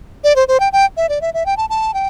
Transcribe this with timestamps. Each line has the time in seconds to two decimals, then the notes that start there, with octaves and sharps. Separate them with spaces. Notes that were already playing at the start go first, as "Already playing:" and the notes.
0.24 D5
0.36 C5
0.48 C5
0.60 G5
0.73 G5
0.97 E5
1.09 D5
1.21 E5
1.34 E5
1.46 G5
1.57 A5
1.70 A5
1.94 G5